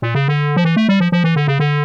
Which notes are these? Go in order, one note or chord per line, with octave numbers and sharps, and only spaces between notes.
A#2
C#3
D3
F3
E3
A3
G3
F3
F3
E3
D3
C#3
D3